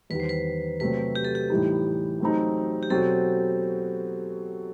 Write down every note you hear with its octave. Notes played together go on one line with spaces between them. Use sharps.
E2 D#3 G3 B4
C5
B4
C3 F#3 A3 C4 B4
G4
A4
G4
A2 E3 G3 D#4
F#3 A3 C4 D#4
G4
B2 F#3 C4 A4